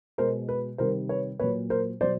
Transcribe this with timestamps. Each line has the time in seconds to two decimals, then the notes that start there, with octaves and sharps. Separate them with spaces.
0.18 B2 G#3 A#4 C5
0.49 B4
0.78 C3 D#3 G3 A#4 C5
1.09 B4 C#5
1.39 A#2 F#3 B4 C#5
1.70 A#4 C5
2.01 B2 F#3 C5 D5